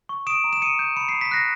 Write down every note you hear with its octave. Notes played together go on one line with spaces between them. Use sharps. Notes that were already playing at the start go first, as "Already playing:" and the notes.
C#6
D#6 D7 E7
A#5
E7
D#6 C#7 D#7
G6
B5 C#7
C7
B5
B6
F#6 A#6 C7